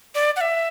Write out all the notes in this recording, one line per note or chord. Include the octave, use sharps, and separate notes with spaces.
D5
F#5
E5